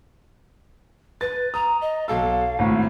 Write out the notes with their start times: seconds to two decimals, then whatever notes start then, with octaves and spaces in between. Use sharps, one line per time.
1.21 B4 A6
1.54 A#5 D#6
1.81 D#5
2.08 B1 A4 F5 E6
2.59 G#1 A2